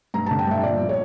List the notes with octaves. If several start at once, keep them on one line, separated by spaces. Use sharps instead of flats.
G2 A#5
D3 A5
G5
G2 E5
A#2 D5
F3
C#5